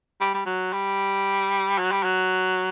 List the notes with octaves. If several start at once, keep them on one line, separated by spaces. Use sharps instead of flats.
G3
G3
F#3
G3
F#3
G3
F#3